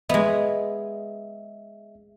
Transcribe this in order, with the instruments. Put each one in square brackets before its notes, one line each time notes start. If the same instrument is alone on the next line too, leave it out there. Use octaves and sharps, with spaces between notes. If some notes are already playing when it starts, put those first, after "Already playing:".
[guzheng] G#3 B3 [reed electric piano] D#5 E5